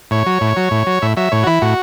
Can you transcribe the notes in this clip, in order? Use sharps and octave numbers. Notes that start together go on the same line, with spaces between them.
A2 C#5
F#3
A2
F#3
A2
F#3
A2 E5
F#3 E5
A2 C#5
F#4
E3 E4
A2 F#4